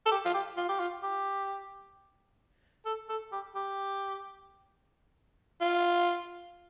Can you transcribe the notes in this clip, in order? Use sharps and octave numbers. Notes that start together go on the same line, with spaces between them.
A4
G4
F4
G4
F4
G4
F4
G4
A4
A4
G4
G4
F4